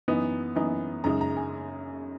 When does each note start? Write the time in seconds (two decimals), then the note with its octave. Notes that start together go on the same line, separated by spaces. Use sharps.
0.08 F#2 E3 B3 D#4
0.56 F#2 E3 B3 D#4
1.04 F#2 C#3 G#3 D#4 A#5
1.21 A#5
1.37 G#5